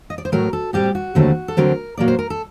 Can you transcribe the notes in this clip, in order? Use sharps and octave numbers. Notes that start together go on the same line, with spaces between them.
D#5
D5
C5
A2 F#3 A3 A#4
A4
A2 G3 C4 G4
F#4
D#2 D3 F#3 A3 C4
A4
D2 D3 F#3 C4 A#4
A#2 F#3 A#3 D5
C5
A#4
A4